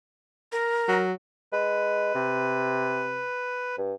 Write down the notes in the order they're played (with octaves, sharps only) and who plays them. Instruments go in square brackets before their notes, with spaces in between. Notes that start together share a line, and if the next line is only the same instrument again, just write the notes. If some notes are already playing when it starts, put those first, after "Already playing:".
[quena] A#4
[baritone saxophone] F#3
[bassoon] G#3 [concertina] B4
[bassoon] C3
G2